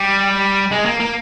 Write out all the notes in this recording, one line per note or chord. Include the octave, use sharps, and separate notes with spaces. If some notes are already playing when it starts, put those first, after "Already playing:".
Already playing: G3
G#3
A#3
A#3